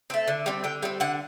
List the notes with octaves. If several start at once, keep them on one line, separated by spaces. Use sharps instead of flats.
A3 C4
D3
G3 C4
D3 G5
G3 C4
D3 F#5